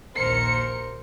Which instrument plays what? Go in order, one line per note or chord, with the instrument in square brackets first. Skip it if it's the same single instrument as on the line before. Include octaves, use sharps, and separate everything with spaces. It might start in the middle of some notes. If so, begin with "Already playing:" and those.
[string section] A#1 D#2 A#4 C5 C#7